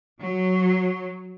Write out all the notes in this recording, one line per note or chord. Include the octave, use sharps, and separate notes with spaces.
F#3